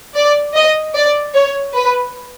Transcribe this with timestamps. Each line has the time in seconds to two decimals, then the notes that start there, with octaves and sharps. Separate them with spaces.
0.16 D5
0.55 D#5
0.95 D5
1.35 C#5
1.75 B4